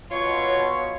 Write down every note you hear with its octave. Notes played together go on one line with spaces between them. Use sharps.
B2 F4 C#5